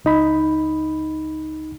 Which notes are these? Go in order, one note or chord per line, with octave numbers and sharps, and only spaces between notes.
C#2 D#4 B5